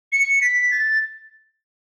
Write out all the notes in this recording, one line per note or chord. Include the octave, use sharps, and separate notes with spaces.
C#7
B6
A6